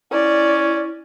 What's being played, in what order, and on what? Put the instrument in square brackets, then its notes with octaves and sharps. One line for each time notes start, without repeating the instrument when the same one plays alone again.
[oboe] C#4 [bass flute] E4 [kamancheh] D5